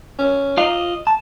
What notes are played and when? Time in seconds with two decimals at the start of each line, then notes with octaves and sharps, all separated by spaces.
0.19 C#4
0.57 F4 D#5 F5
1.07 A5